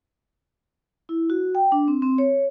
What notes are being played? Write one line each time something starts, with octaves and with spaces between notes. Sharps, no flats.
E4
F#4
G5
D4
C4
C4
C#5